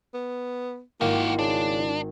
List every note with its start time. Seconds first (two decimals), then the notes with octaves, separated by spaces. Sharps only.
0.14 B3
1.01 G#1 A#3 E4 F#4 G4
1.39 C#3 D4